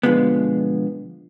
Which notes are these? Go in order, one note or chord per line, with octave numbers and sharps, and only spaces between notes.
B2 D3 F3 G#3 B3